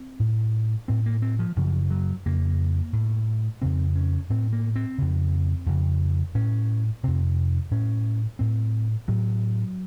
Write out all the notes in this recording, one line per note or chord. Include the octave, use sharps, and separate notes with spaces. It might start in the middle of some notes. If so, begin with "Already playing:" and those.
Already playing: C4
A2
A2 C4
A#3
C4
F3
F#2 C#3 F3
F#3
F2 C#3 A#3
A2
F2 C#3 C4
C#4
A2 C4
A#3
C4
F2 C#3
F2 C#3
A2 C#4
F2 C3 C4
A2 C#4
A2 C4
A2 F#3